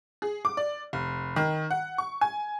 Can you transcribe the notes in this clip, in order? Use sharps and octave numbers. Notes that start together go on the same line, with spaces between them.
G#4
D6
D5
F1
D#3
F#5
C#6
G#5